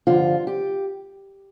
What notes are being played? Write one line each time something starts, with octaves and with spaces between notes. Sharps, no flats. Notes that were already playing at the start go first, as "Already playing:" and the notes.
G2 D3 F3 F4
G4